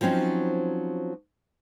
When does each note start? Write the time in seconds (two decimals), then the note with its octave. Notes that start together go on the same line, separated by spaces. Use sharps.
0.01 F3 F#3 C4 C#4 D#4